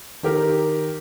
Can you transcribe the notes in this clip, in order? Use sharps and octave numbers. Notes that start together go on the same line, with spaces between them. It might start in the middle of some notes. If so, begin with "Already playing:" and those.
D#3 G4 A#4